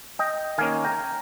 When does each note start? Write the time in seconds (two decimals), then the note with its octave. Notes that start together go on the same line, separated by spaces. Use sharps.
0.19 D#5 G5
0.58 D#3 A#3 C#4 F5 G#5
0.84 G5 A#5